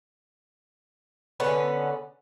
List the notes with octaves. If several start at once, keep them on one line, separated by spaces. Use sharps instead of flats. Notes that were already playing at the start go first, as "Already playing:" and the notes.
D3 B3 C#4 B4